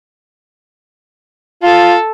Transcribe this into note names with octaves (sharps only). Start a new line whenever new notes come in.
F4 A4